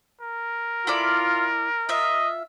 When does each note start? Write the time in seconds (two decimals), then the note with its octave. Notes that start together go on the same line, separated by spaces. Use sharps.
0.21 A#4
0.87 E4 F4 A4 D5
1.89 F4 D#5 E5